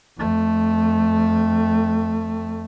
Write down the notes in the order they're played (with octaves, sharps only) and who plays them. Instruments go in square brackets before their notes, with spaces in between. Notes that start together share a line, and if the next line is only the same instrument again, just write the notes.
[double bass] F2 A3